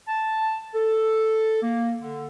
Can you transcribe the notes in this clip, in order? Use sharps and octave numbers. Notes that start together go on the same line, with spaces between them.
A5
A4
A#3
D3